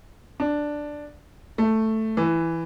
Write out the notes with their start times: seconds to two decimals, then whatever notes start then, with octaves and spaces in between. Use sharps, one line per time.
0.40 D4
1.58 A3
2.17 E3